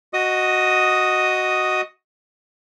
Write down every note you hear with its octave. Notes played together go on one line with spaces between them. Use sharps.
F#4 D#5 D#6